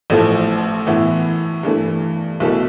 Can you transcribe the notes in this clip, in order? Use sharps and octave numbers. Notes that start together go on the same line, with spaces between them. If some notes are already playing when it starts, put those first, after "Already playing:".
A1 A2 F3 A3
A2 E3 B3 E4
G2 E3 A3
B1 B2 A3 E4 A4